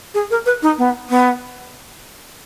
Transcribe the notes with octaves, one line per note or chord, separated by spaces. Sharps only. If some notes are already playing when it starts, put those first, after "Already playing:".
G#4
A#4
B4
D#4
B3
B3